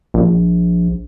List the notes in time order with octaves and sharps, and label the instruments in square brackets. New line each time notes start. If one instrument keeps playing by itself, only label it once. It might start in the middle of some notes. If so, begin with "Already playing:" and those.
[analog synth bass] A#1